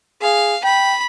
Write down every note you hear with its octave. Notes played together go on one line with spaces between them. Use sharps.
G#4 F5
G5 B5